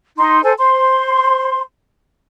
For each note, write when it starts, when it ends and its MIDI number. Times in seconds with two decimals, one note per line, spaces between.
0.18 0.41 63
0.18 0.41 84
0.43 0.53 69
0.43 0.53 72
0.43 0.53 80
0.58 1.60 72
0.58 1.60 84